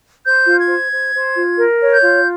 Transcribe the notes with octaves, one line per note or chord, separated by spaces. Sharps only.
C5 G6
F4
G#6
C5
C5
C5
F4
A#4
C#5
G6
F4